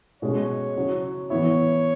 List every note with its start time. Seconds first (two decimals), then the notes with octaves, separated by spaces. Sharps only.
0.22 B2 G#3 C#4 C#5
0.76 C#3 F#3 E4
1.30 E3 B3 E4 C#5